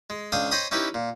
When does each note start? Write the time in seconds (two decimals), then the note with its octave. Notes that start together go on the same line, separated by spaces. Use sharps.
0.10 G#3
0.32 C#2 D4 F5 G5 D#6
0.51 C5 C#5 D#5 G5 B5 D#6
0.71 C#4 D#4 E4 G4 B4
0.94 A#2